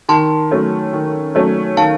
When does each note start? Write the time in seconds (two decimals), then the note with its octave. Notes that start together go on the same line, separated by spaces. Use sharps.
0.09 D#3 A5 C6
0.51 F#3 A3 C#4
0.93 D#3
1.35 F#3 A3 C#4
1.77 D#3 F5 A5